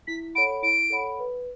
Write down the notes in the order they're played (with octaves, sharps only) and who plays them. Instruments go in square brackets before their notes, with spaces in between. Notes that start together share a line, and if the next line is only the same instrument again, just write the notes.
[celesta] E4 [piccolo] B6
[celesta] A4 C#5 F#5 B5 [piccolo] D7
[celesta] E4 [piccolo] D7
[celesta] A4 C#5 F#5 B5
B4